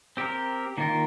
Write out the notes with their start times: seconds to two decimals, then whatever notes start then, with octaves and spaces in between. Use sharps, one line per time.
0.17 C4 G4 A#4
0.78 D#3 A#3 F4 A#4